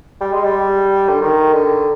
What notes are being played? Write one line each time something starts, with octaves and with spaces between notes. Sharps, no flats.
G3
G#3
G3
D3
D#3
D3